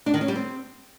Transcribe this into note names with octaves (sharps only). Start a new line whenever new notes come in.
D4
D#3
C#4
G3
C4